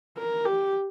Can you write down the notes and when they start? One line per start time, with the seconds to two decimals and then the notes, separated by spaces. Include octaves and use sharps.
0.17 A#4
0.46 G4